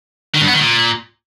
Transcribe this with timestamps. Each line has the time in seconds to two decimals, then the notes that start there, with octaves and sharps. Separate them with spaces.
0.35 D#3
0.41 G2
0.47 B3
0.53 D#3
0.60 A#2